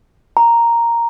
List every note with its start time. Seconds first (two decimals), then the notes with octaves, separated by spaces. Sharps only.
0.37 A#5